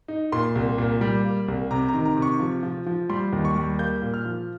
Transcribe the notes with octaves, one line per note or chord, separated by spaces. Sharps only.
D#4
A#2 C6
C2
A#2
G3
A#3
C2
C3 A#5
A#5
D#3
A#5
C3
C#6
F3
F3
F3
G3 C6
D#2
C#6
G3
A#3 G6
A#2
F6
F3